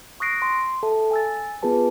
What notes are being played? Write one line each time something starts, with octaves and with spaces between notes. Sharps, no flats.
C#6 D#6 F#6 A#6 C7 D7
C6
A4 E5 A5
G#5 E6 A6
B3 F4 G#4 B4 A5